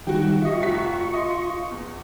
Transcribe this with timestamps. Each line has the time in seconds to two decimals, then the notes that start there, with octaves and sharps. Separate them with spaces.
0.07 D#3 G3 F#4 G5
0.42 F4 D#5 E5 C#6
0.60 F1 F#4 B6
1.13 D#5 C6
1.71 E2